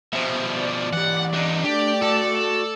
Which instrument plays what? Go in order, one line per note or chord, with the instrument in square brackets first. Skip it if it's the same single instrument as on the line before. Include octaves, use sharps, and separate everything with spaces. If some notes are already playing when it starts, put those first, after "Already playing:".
[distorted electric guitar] B2 F3 [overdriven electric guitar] C5 E5
[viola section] D5
[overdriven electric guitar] E3 G4 [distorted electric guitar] F#5
[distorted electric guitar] D4 D#4
[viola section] A3 D5 [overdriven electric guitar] D4 [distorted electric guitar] G4
[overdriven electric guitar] F#4 G5 [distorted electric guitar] A4